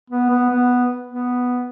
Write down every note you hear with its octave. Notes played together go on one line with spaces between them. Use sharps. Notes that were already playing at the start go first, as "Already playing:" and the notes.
B3
B3
B3
B3